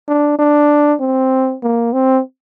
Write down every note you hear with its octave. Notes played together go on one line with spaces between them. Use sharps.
D4
D4
C4
A#3
C4